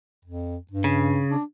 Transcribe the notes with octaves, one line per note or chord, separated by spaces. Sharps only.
F2
G2
C#3
D4